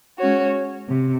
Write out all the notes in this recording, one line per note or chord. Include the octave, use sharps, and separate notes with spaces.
G#3 C#4 F#4 C#5
C3